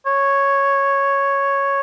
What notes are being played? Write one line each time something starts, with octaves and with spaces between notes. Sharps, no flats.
C#5